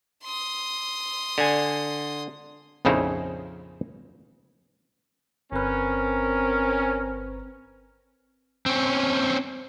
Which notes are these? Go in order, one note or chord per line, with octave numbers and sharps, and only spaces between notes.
C6 D#6
D3 G#5
A#1 F2 C#3 D#4 E4 C5
G1 C4 C#4 A#4 B4
C4 C#4